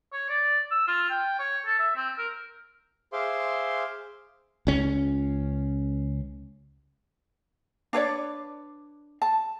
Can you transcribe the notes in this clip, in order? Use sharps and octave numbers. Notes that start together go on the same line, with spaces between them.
C#5
D5
E6
F4
G5
C#5
A4
E5
C4
A#4
G#4 C5 E5 F5 C6 D6
C#2 C#4
D4 B4 C#5 D5
A5